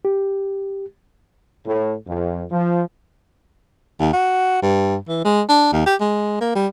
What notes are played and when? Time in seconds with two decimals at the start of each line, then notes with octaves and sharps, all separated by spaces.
0.05 G4
1.66 A2
2.07 F2
2.51 F3
4.00 D#2
4.13 F#4
4.62 G2
5.08 E3
5.24 G#3
5.49 D4
5.73 D#2
5.86 G4
6.00 G#3
6.41 A#3
6.55 G3